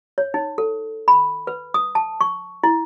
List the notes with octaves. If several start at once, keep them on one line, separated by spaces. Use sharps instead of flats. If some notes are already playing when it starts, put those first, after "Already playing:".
C#5
D#4
A4
B5
B4
D#6
A5
C#6
E4